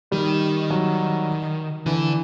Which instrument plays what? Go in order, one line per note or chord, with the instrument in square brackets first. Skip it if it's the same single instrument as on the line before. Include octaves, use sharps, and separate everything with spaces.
[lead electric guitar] D#3 [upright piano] G3
[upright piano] F#3
[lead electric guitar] D3 [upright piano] E3